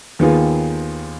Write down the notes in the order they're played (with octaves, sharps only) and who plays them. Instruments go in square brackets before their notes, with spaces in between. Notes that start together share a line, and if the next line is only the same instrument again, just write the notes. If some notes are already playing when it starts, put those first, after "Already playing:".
[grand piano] D#2 D#3 B3 F4 G#4